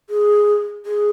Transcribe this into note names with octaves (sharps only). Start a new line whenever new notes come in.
G#4
G#4